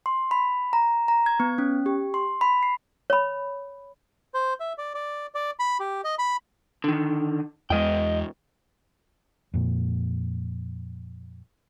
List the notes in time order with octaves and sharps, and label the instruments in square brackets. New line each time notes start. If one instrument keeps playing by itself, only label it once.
[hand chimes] C6
B5
A#5
A#5
G#6
B3
C#4
G4
C6
B5
C7
[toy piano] C#5 B5
[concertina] C5
E5
D5
D5
D5
B5
G4
D#5
B5
[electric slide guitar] D3 D#3
[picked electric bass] E2 G#3 [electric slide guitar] D#5 G5
[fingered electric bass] F2 A#2